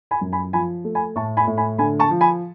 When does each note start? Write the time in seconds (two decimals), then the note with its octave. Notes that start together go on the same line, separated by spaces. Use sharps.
0.11 G#5 B5
0.21 F#2
0.33 G#5 B5
0.53 F3 G#5 B5
0.85 A3
0.95 G#5 B5
1.16 A2 A5 C#6
1.37 G#5 B5
1.47 A2
1.57 G#5 B5
1.78 D3 G#5 B5
1.99 A5 C#6
2.11 F3
2.21 G#5 B5